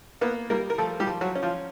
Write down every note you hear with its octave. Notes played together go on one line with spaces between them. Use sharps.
A#3 B3 B4
G3 A#3 A#4
A#4
F3 A3 A4
G3 G4
F3
F#3 F#4
C#4
F3 F4